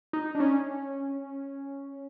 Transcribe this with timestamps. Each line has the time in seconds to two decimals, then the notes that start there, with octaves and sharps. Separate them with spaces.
0.13 D#4
0.35 D4
0.40 C#4